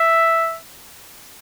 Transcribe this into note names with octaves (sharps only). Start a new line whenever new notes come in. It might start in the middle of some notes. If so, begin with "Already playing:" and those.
Already playing: E5